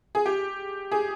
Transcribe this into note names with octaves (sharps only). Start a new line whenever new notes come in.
G#4
G4
G#4